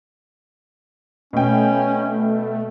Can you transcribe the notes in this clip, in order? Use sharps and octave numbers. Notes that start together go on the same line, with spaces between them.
B2 A3 C#4 G5